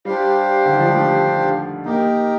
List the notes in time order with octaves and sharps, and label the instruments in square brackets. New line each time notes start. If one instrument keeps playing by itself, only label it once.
[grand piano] G3 [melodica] D4 G4 C5 F5
[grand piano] D3
D#3
F3
G3
A3
[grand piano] A#3 [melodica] D#4 G4 A#4